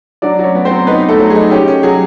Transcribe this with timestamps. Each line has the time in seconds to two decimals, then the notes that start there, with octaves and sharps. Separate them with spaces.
0.22 F#3 D4 D5
0.39 F#3 C#4 C#5
0.55 B3
0.65 C4 C5
0.71 F#3
0.87 B3 D#4 B4
1.03 D#4
1.08 A3 A4
1.19 F#3
1.30 G#4
1.35 D#4
1.51 C#4 G4
1.68 C#4
1.83 F#3 G#4